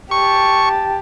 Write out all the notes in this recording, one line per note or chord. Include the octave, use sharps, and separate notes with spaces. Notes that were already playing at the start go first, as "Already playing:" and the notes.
G4 A5 C#6